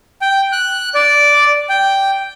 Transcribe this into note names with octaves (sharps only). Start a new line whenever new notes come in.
G5
F#6
D5
G5